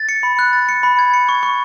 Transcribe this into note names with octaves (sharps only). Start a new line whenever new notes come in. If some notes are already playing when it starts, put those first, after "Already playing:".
Already playing: A6
C#7
B5
F#6
A6
C#7
B5
G#6
C#7
C#6
C#6